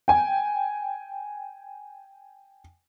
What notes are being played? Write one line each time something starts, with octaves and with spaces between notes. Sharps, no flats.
G5 G#5